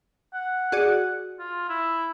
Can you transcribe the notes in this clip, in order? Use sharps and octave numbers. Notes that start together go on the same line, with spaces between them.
F#5
F#4 G#4 D5
F4
E4